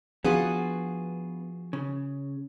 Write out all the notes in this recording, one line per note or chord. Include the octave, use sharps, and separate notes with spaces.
F3 B3 D4 F4 F#4 G#4
C#3